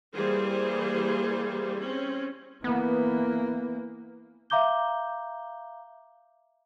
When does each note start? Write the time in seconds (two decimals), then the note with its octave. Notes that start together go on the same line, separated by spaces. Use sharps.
0.14 E3 G3 A#3 G#4 C5
1.79 C4 C#4
2.64 E3 A#3 B3
4.50 E5 F5 A#5 D6 G6 G7